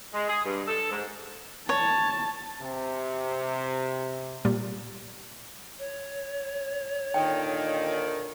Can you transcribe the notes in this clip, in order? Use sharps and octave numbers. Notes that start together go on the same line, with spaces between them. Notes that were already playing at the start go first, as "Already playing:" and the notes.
G#3
G#4
G2
A4
G#2
C#5 A5
C3
A#2 G3
C#5
A#2 D3 D#3 G5